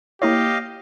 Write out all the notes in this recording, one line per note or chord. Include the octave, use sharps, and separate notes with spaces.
A#3 E4 G4 C#5 D#5 F5